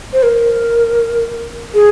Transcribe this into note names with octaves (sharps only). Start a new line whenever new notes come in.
C5
A#4
G#4